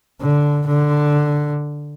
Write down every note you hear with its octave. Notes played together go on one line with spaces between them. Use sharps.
D3
D3